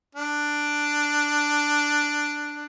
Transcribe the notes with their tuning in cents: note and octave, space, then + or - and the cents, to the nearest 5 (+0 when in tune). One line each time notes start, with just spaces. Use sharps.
D4 +5